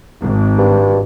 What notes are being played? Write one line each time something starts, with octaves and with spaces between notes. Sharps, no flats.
G#1
G2